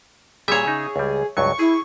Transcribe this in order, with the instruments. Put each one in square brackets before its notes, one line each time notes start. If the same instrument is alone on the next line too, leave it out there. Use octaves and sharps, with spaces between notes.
[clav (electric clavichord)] A#2 G3 [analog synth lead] G#4 [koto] C#5 E5
[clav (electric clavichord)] C#3 D#4
C#2 G3
[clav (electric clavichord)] C#2 G2 F#3 [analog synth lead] C#6
[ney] E4 [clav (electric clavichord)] G#4